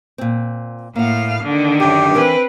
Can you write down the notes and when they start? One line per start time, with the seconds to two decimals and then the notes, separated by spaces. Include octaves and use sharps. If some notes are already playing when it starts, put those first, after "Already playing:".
0.18 A#2 C4
0.96 A2 A#3 F5 F#5
1.43 D3 D#3
1.80 F#2 D4 G4
2.14 E3 C4 A#4 B4 G5